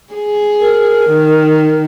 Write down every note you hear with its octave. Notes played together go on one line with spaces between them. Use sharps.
G#4
A#4
D#3